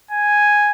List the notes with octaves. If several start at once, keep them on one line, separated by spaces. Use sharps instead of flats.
G#5